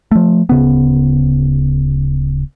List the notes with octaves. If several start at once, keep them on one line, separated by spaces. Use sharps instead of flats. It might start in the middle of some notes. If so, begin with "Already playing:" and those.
F3 A3
D1 C#3 B3